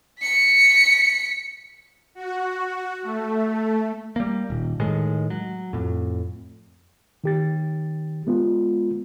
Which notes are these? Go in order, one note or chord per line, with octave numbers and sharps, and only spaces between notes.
B6 C#7
F#4
A3
G3 A#3
D#1
A2 D#3 G#3
F#3
F2 A2
D#3 G4 A6
G#3 B3 F4